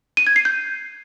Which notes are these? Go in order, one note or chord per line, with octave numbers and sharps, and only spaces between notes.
D#7
G#6
C7
G6